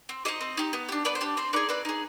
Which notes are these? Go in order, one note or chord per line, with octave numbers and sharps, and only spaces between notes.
C4
D#4 G4 C5 D#5
C4
D#4 G4
B3
D4 G4
B3 B4 D5
C5
D4 G4
C4 C5
D#4 G#4 B4 D5
C4 B4 D5
D#4 G#4